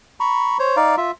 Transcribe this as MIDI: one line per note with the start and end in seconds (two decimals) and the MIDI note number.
0.20 0.57 82
0.20 0.57 83
0.20 0.57 85
0.59 0.76 72
0.59 0.76 73
0.77 0.96 63
0.77 0.96 74
0.77 0.96 77
0.97 1.11 65
0.97 1.11 76